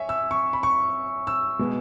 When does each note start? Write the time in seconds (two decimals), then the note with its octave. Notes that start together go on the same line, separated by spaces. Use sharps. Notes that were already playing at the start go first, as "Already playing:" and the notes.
Already playing: C#5 E5 G#5
0.09 E6
0.31 C#6
0.53 B5
0.63 C#6
1.27 E6
1.59 B2 G#3 B3